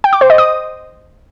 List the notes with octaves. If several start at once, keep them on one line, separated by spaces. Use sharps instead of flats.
G5
D6
C5
D#5
D#6